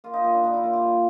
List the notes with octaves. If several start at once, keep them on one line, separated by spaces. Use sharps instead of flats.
A#3 F4
D#4
A#2 D#4
D4
A#2 D#4
E4
A#3 F4
G4
G3